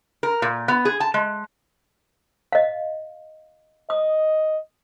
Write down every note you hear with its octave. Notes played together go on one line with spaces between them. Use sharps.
A#4
A#2
B3
G#4
A5
G#3
D#5 F5
D#5 D#6